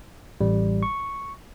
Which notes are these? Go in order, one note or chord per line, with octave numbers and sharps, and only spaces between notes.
A1 G3
C#6